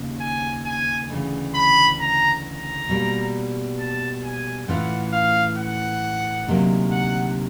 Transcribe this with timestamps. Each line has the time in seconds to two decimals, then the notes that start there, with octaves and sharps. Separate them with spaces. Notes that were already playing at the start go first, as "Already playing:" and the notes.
Already playing: D#2 C#3
0.21 G#5
0.65 G#5
1.10 D2 C#3 E3
1.55 B5
2.00 A#5
2.45 A#5
2.89 B2 G3 A#3
3.79 A5
4.24 G#5
4.68 A2 E3 A3 C#4 F4 F#5
5.13 F5
5.58 F#5
6.48 D2 C3 D#3 F#3 A#3
6.92 F#5